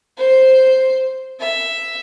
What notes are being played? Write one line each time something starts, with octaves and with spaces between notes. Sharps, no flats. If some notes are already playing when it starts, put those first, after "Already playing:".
C5
E5